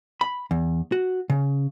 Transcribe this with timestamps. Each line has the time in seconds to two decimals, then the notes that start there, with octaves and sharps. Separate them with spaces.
0.21 B5
0.51 E2
0.92 F#4
1.30 C#3